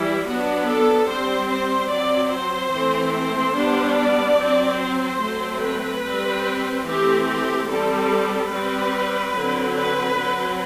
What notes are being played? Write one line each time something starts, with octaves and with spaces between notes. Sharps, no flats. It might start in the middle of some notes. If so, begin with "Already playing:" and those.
Already playing: E3 G3 E4
F#3 B3 D4 F#4
A4
G3 C4 C5
C5
F#3 C4 D5
C5
E3 A3 C4
C5
G3 B3 D4
D5
F#3 C4
C5
F#3 A3 C4
B4
G3 C4
E3 A3 C4 G4
G4
G3 C4 A4
G3 C4 B4
D3 F#3 C4
B4
F#3 C4